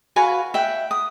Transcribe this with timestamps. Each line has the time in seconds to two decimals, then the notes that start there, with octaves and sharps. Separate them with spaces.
0.16 F#4 B4 F5 G#5
0.54 E5 F#5 G5
0.91 D#6